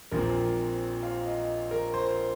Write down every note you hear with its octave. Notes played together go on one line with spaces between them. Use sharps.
A#1 A#2 F3 C4 A#4
F5
D#5
A#4
C5